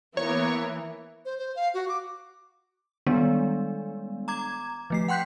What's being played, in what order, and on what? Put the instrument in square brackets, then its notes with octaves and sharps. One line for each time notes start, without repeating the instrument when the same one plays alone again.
[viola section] E3 [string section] A#3 B3 A#4 [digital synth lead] C#5
[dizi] C5
C5
F5
F#4
D6
[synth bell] D#3 G3 G#3 B3 D4
A#5 D6 G#6
F3 A3 C7
F#5 G5 C6 F#6 G6 B6